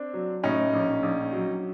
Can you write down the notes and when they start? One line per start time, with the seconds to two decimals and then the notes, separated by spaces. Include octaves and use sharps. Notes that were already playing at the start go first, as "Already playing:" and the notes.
Already playing: C4 D4
0.14 F#3
0.43 A2 C#4 D#4
0.74 A#1
1.03 A#1
1.33 F#3